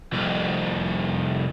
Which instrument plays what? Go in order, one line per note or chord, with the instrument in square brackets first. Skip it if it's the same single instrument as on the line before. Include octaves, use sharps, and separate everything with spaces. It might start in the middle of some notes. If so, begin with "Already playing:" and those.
[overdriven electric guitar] C2 F2